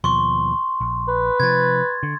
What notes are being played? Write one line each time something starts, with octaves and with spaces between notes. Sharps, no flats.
D#2 B2 F3 C6 C#6
A#1
B4
C3 F3 G#6 A6
D3